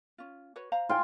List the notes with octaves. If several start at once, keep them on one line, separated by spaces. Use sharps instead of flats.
C#4 F4
F#4 B4 C#5
C5 F5 A#5
F4 G5 G#5